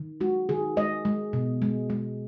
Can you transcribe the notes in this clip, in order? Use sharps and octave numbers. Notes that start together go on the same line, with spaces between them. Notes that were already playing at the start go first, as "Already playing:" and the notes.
Already playing: D#3
G#3 F#4
D#3 G#4
G#3 D#5
G#3
B2
G#3
G#3